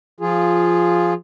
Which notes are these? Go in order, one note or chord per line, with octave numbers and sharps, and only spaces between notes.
F3 F4 G#4